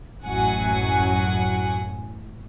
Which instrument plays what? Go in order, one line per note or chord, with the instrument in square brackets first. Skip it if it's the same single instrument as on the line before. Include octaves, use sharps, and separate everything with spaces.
[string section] A1 F#2 F#3 F#5 G#5